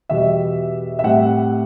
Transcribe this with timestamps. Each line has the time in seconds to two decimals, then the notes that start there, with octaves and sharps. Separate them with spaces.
0.09 E2 B2 G3 E5
0.99 E5
1.04 A2 G3 C4 F#5